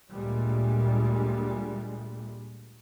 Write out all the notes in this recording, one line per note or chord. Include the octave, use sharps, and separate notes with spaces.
D2 A#2 G3 G#3